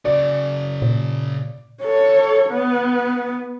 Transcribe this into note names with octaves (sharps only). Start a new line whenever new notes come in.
C#3 F#4 D5
A#2
A4 C#5
B3